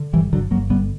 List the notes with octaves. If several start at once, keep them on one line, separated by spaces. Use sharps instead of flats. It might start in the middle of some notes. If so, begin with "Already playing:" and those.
Already playing: D3
G1 E3 G3
G1 D3 F#3
G1 F#3 A#3
D3 G3 B3